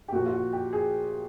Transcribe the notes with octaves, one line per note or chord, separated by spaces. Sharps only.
G4
A#2 F3 F#4
F4
F#4
G4
G#4